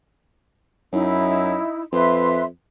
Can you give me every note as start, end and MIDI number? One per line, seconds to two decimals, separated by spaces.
0.92 1.58 42
0.92 1.82 63
0.92 1.82 64
1.93 2.47 41
1.93 2.43 71
1.93 2.43 76
1.93 2.43 84